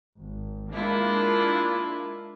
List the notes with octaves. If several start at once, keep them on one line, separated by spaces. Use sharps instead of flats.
G#1
G#3 A#3 D4 E4 F4